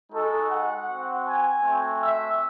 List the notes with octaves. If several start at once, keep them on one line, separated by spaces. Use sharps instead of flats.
G#3 D#4 F#4 A4
F#5
C4 F#4
G#5
A3 C4 F#4
E5